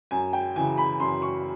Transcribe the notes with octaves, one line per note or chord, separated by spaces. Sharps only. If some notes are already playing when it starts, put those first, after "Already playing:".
F#2 G#5
G5
C#3 E3 G#5
B5
F#2 C6
C#6